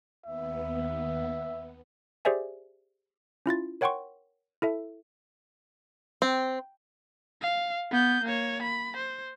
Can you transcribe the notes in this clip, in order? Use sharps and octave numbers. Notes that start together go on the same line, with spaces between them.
D#2 B3 E5
G4 G#4 C5 D5 E5 G#5
C#4 E4 F4 A6
A#4 C#5 F#5 G5 C6 C#6
E4 A4 E5
C4
F5
B3 G6
A#3 C#5
B5
C5